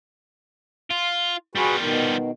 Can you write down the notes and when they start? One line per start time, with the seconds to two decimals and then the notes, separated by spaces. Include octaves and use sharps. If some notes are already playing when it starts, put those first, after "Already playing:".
0.90 F4
1.55 G3 F4 F#4 G#4 B4
1.78 B2 D#3